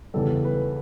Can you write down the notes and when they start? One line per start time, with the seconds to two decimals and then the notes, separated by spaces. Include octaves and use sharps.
0.14 E2 C#3 E3 G3 A4
0.45 B4